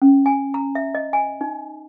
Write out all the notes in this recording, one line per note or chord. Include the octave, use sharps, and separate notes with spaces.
C#4
G#5
A#5
E5
D#5
G#5
D#4